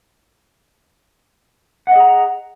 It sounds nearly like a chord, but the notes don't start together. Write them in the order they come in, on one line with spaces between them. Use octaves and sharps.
F#5 D#5 G#4 A#5